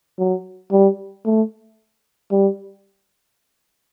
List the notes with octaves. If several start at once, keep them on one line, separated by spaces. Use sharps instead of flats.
F#3
G3
A3
G3